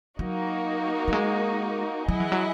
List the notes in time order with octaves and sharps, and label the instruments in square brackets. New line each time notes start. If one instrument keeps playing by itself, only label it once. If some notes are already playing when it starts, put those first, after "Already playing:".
[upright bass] F#3 [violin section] A#3 D#4 F#4
[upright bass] F#3
G#3
[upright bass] F#3 [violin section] E4 G#4 D#5 F#5
[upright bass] E3
F#3